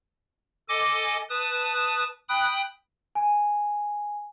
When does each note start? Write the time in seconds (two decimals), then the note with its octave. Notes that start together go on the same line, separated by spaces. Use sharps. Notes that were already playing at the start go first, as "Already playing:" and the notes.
0.69 A4 D#5 G#5 D6
1.30 B4 A5 D#6
2.29 G5 B5 D#6 F#6
3.15 G#5